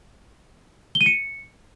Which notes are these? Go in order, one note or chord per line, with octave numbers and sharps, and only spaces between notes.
G7
D#7
C#7